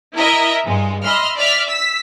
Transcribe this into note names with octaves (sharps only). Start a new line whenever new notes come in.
E4 A#4 D#5 E5
G2 G#3
D#5 E5 B5 C6 F6
D5 E5 F6 B6
E6 B6